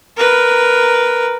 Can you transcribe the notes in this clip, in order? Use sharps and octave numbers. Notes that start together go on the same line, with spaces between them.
A#4 B4